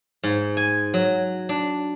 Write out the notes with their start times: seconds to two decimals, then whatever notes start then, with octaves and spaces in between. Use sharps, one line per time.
0.23 G#2
0.57 G#5
0.94 F#3
1.49 D4